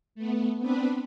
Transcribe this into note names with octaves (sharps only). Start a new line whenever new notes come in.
A3 B3
B3 C4 D4 B4